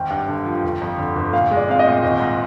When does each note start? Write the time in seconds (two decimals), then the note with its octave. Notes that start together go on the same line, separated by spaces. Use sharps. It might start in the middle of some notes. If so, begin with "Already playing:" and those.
Already playing: G#1 G5
0.10 G2
0.28 D3
0.46 F3
0.64 G1
0.81 F2
0.98 D3
1.16 G1
1.33 A#2 F5
1.51 G#3
1.57 D5
1.69 C4 F5
1.79 D#5
1.86 A#2
2.03 G#1
2.20 G#2